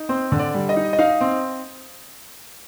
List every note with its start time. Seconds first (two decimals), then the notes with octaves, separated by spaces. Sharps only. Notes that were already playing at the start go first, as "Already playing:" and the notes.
Already playing: D#4
0.09 C4 C5
0.32 D3
0.39 D5
0.54 G3
0.69 D#5
0.77 D#4
0.93 D#5
0.99 D#4 F5
1.21 C4